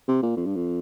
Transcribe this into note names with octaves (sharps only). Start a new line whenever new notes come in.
C3
A#2
F2
G2
F2